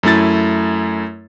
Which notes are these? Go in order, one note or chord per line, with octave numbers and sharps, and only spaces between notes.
F#2 A3 E4 A6